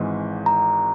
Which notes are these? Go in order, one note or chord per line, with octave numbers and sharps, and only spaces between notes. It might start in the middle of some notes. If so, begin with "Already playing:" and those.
Already playing: G#1 G#2 E3
A#5